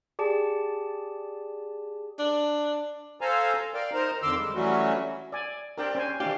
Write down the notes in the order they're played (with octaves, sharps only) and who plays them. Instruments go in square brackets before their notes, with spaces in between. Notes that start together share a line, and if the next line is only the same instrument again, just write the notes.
[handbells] G4 G#4 D5 A5
[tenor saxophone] D4
[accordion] A4 C5 F5 G#5 A#5
A#4 D5 F5 G5
D#4 A#4 C5 A#5
F2 D3 D#3 C6 D6 E6
G3 G#3
E3 F#3 G3 A3 C#4 F#4
[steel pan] D5 G#5
[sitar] C4 D4 G4 [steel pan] A#4 D5 G5
[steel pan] C#4 C5 G#5
[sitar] D#3 A3 D4 [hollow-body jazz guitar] G4 [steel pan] F5